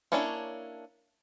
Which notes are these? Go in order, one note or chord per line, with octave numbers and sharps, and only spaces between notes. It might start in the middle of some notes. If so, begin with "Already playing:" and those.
A#3 C#4 D4 E4 C#5